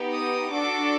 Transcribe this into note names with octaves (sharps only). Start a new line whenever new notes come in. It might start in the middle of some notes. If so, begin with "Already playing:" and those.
Already playing: B3 D#4 G4
D#6
D4 F#4 A4 D6